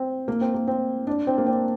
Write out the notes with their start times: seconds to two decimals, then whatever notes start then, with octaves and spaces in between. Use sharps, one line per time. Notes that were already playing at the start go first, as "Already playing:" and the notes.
Already playing: C4
0.28 A#3
0.41 C4
0.54 A#3
0.67 C4
1.07 D4
1.27 C4
1.38 A#3
1.46 C4